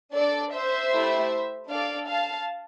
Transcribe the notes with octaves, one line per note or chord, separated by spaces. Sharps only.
D4 A4 D5
C5 E5
A3 E4 G4
D4 A4 D5 F5
F5 A5